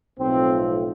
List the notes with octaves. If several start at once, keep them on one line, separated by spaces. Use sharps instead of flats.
B1 A2 F3 C4